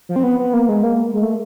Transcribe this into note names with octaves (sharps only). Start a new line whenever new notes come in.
F3
C4
B3
B3
A#3
G#3
A#3
G#3
A3